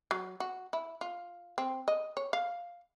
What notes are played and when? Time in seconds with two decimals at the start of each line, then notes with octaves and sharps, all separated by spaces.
0.11 F#3
0.40 F#4
0.73 E4
1.01 F4
1.58 C4
1.88 D#5
2.17 C#5
2.33 F5